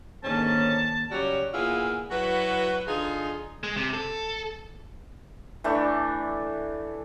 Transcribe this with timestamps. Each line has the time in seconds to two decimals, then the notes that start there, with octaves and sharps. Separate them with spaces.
0.24 G#2 D3 D#3 A#3 C#4 A5
1.11 C#3 F#3 G3 F#4 G4 C#5
1.54 A#2 B3 E4 F4 G#4
2.11 F#3 E4 F#4 B4
2.88 D3 D#4 F4 G#4
3.63 G#3
3.77 C3
3.93 A4
5.64 E3 A3 D4 C#6